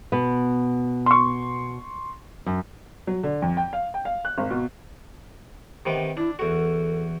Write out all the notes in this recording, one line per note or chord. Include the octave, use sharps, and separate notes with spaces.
B2 B3
C6 C#6
F#2
F#3
D3
F2
G5
F5
G5
F5
F#6
G#1
B2
C3 D#3 B3
D4 E4
E2 F#4 A4